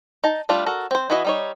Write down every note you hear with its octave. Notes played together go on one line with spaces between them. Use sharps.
D#4 A5
G3 A3 D4 F4
F#4 A4 A#4
C4 C5
E3 B3 E4 F#4 D#5
G3 D#4 C#5